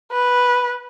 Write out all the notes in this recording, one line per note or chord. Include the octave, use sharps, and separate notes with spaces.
B4